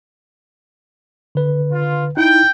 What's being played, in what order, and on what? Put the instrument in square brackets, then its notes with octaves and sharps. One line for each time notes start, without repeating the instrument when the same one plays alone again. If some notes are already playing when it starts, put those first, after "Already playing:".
[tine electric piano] D3 B4
[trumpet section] F4
[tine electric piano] D#4 E4 [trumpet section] G5